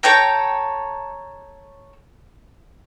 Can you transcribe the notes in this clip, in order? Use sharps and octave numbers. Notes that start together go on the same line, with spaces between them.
A4 C#5 G5 A#5